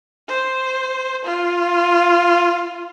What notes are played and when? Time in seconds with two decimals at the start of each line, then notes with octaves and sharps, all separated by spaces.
0.28 C5
1.25 F4